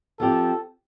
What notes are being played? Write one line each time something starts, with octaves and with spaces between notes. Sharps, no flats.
F3 C4 G4 A4